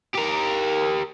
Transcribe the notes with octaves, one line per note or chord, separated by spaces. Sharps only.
G4 A#4